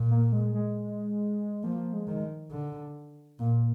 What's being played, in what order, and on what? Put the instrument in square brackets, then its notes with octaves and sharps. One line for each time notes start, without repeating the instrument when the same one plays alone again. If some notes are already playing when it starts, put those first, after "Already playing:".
Already playing: [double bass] A#2
[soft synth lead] A#3
G#3
G#3
[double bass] F3 [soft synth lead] A#3
[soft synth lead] G#3
[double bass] D#3
D3
[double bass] A#2 [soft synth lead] A#3